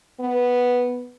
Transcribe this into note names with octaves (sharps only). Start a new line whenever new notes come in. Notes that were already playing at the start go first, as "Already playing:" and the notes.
B3